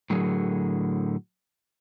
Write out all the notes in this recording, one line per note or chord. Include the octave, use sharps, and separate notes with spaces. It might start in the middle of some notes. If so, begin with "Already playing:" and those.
A2 D3 F#3 G#4 A#4